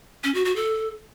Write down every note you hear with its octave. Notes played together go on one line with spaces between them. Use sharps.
C#4
F#4
F#4
A4